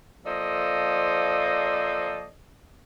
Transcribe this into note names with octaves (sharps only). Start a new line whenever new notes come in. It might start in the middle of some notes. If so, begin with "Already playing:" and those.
F3 A#3 A4 C5 D5 D#5